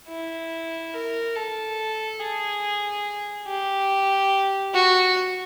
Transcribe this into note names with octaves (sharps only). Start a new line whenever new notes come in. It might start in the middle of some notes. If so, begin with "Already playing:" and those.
E4
A#4
A4
G#4
G4
F#4